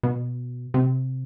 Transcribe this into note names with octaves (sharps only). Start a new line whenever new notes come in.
B2
C3